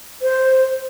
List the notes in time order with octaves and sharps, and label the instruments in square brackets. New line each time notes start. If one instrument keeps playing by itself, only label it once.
[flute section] C5